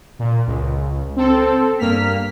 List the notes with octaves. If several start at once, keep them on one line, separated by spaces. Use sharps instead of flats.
A#2
C#2
C4 A4
G2 A#3 F6 B6